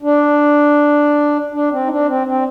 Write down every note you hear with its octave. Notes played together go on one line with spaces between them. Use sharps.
D4
D4
C4
D#4
D4
C4
C4